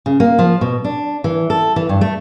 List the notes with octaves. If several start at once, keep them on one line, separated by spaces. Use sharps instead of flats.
C#3
A#3
F3
B2
D4
E3
A4
E3
G2
A3